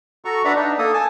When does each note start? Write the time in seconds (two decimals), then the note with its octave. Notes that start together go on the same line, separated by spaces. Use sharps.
0.25 F#4 A4 A#5 C#6
0.45 D4 B4 D5 E5 F#5 A#5
0.56 D4 D#4
0.78 A#3 A4 D#6
0.94 G#5 A5